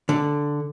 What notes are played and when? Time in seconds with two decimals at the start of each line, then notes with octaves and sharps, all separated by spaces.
0.09 D3